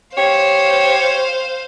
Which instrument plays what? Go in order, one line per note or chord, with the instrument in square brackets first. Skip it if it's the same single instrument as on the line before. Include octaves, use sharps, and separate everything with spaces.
[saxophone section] G4 C#5 [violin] C5 F5